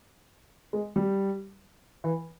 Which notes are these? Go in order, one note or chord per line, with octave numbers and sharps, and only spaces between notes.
G#3
G3
E3